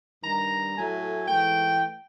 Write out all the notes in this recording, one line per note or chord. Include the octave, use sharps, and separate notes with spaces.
G2 D#3 G3 A#5
A2 F#3 A3 G#5
G#2 E3 A3 G5